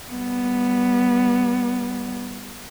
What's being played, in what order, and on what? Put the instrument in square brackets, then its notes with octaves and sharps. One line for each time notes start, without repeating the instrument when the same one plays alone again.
[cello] G3 B3